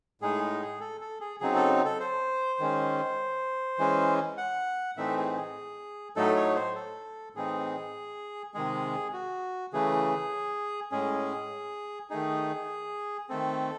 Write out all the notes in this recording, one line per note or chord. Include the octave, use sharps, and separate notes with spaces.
A2 G#3 D#4 G#4
G#4
A4
A4
G#4
C#3 F#3 C4 D#4 G#4
A4
A4
C5
D#3 G#3 C#4
E3 G#3 C#4
F#5
A2 E3 A3 C4 D#4 E5
G#4
G#4
A2 F#3 A3 D#4 A4
C#5
C5
A4
A2 E3 C4 D#4 G#4
C3 D#3 G#3 G#4
F#4
C#3 E3 A3 G#4
A2 G#3 C#4 G#4
D#3 A3 D#4 G#4
D#3 A3 C4 A4